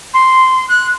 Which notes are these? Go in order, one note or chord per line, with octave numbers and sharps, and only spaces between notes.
C6
F#6